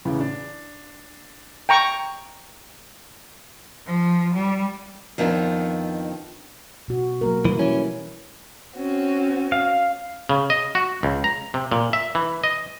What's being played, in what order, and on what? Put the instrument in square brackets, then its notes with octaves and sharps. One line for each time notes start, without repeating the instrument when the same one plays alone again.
[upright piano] E2 A2 C#3
D4
[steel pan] G5 A#5 C#6
[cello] F3
G3
[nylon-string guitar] F2 D#3 F3 B3 C4 D4
[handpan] B2 F#4
F#3 A#3 A#4
[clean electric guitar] E3 [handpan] G3 E4
[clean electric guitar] E3 C#4
[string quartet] C4 C#4 F#4
[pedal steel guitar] F5
[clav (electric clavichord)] C#3
D#5
F#4
C#2
A#5
C3
A#2
E5
E3
D#5